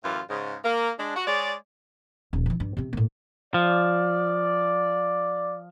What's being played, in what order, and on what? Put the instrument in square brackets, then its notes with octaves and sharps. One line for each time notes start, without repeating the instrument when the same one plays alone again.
[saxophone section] F#2 A2 E3 F4
G#2 C#3
A#3
G#3 D4
F#4
G#3 G#4 C#5 D5
[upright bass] D#1 F2
E3 F3
G2
C3 C4
A2 A#3
[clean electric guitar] F3 [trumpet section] D5